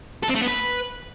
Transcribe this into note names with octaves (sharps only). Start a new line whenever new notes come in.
A4
C4
A3
B3
B4